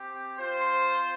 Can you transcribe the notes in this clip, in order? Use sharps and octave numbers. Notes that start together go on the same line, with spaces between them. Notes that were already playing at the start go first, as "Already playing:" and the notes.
Already playing: C4 G4
C4 F4 C5